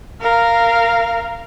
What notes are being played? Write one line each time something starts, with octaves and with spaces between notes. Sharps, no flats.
A#4 F5